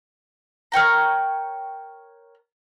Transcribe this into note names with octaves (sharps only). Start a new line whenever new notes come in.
A#4 C#5 G5 A#5